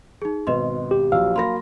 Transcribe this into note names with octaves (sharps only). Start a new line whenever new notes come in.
D#4 G#4
G#1 B2 B4 D#5 C6
G4
A#1 F3 F#3 F5 E6
F#3 A#3 B5 C6 A#6